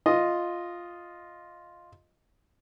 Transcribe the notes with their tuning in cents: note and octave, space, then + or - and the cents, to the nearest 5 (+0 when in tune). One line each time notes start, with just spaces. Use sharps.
F4 +0 D#5 +0